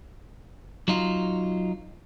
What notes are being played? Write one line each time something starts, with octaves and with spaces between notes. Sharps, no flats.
F#3 D#4 F4